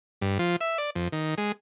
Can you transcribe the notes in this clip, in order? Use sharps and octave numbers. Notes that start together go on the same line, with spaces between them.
G2
F3
E5
D5
F2
D#3
G#3